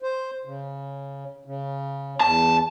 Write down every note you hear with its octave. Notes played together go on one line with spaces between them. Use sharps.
C5
C#3
C#3
E2 A5